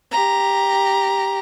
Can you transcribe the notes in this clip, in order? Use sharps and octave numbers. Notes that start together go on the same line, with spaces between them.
G4 A#5